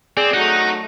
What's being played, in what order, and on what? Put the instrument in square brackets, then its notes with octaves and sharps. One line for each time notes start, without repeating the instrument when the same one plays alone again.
[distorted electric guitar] C4 [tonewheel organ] G#4 D5
[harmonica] F#3 A3 [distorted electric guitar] D#4 [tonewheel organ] F#5